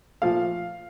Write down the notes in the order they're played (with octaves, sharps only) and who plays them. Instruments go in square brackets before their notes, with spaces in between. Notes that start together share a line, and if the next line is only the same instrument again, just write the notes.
[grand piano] A#2 F3 A3 F5